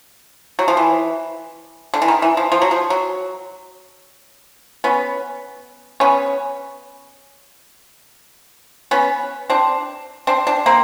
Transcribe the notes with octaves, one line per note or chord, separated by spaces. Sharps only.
F#3
F3
E3
D3
E3
D#3
E3
F3
F3
F#3
F3
F#3
B3 C#4
B3 C#4
B3 C#4
C4 D4
C4 D4
C4 D4
A#3 C4